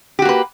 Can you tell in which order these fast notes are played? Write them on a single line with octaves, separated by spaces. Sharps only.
G4 F#4 A#3 B4